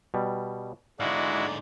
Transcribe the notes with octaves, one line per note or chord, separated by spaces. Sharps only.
B2 G3
G#2 D3 G#3 D#4 E4 F#4 D5 F5